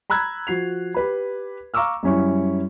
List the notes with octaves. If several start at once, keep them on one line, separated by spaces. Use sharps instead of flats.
A#5 B5 E6 F#6 G#6
F3 F#4 C7 F7
G4 B4 B5
F5 A#5 C#6 D6 E6 F6
F#2 G3 C#4 E4 C#6